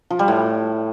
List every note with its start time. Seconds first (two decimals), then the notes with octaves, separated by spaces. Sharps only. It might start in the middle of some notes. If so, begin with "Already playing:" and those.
0.10 F3
0.19 G3
0.28 A2